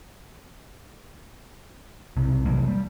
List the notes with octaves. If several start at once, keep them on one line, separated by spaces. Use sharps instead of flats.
B1 C3
C3 E3 F#3 A#3
G3